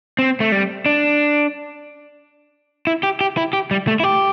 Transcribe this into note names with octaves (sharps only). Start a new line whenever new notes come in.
C4
A3
G3
D4
E4
G4
G4
E4
G4
G3
A3
E4
G4